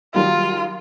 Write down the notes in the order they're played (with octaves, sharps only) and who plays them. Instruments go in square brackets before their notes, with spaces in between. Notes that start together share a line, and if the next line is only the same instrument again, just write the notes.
[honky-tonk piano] D#3 F#3 G3 [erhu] F4